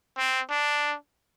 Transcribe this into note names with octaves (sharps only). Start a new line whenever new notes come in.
C4
D4